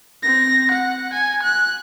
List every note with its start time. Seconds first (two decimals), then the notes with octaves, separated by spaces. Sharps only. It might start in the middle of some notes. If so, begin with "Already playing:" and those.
0.23 C4 A#6
0.72 F#5
1.13 G#5
1.43 F#6